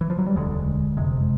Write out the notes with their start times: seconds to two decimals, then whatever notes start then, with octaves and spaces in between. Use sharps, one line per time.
0.01 E3
0.10 F3
0.18 F#3
0.26 G3
0.36 E1 D2 D3 G#3
0.97 F#1 F2 C3 G#3